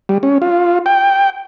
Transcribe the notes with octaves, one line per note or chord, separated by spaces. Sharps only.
G3
C#4
F4
G5